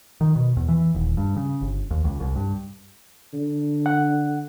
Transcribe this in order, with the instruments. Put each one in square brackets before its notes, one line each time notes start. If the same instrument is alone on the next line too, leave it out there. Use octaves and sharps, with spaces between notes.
[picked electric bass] D#3
B2
E2
E3
D#1
G2
C#3
G1
D#2
C#2
C2
G2
[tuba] D3
[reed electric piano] F#5